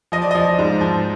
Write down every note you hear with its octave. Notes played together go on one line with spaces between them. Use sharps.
F3 D#5
D5
F3 D#5
G#2
F3